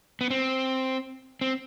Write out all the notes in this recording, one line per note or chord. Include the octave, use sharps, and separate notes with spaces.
B3
C4
C4